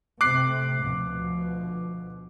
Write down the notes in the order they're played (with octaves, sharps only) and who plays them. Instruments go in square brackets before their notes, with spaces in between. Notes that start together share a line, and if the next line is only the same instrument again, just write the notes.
[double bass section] C3 A3 C4 [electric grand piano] D6 F#6 C7
[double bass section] D2 B2 F3